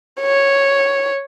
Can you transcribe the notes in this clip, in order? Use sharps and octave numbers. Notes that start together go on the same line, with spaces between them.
C#5